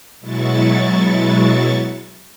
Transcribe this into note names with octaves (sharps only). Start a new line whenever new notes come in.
B2 F#3 G#3 E4 C#6 A6